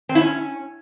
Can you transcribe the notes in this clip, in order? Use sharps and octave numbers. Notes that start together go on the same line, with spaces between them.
C4
E4
C#4